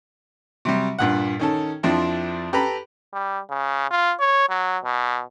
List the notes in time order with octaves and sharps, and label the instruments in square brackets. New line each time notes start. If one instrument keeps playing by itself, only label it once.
[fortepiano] C3 F#3 G3
G2 A#2 F#5
D#3 C#4 A4
F2 F3 C4 D4 E4
G4 A4 B4 A#5 B5
[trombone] G3
C#3
F4
C#5
F#3
B2